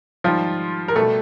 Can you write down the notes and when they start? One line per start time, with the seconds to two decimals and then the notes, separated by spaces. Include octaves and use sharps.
0.24 G#2 D#3 F3 G3 F4
0.88 A#4
0.95 B2 G3 A3 A4